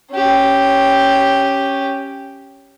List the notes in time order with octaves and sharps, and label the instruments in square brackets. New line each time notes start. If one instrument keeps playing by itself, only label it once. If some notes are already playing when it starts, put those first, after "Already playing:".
[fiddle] C#4 G4